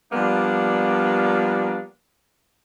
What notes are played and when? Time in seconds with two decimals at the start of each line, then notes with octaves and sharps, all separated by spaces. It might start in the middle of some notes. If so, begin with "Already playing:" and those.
0.12 F3 G3 A#3 B3 D4